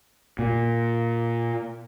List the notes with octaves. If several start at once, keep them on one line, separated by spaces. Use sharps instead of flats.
A#2